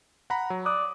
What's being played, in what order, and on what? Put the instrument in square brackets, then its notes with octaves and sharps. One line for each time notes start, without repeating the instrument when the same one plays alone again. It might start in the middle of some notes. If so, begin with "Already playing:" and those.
[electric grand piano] F#5 A#5 B5
F#3
[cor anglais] D5 [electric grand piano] D#6 F#6